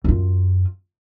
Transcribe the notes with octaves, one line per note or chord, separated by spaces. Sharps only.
F#2 F4